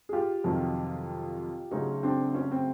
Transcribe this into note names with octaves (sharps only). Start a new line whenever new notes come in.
G#4
F4 G4
F2 C3 D#3 F#3
D2 C#3 F#3 C#4 D#4
C4 D4
C#4
C4